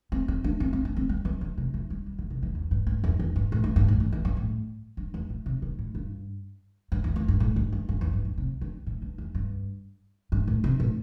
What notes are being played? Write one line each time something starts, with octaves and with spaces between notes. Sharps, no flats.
C4
C4
D4
C4
C4
D4
C4
G3
E3
D3
C3
E3
G3
G3
D3
C3
E3
E2
G2
G2
E2
E2
G2
A2
G2
G2
A2
D3
E3
G2
A2
G2
E2
A2
C3
D3
A2
G2
G2
E2
E2
G2
A2
G2
G2
G2
E2
G2
G2
C3
D3
A2
G2
E2
G2
G2
A2
C3
A2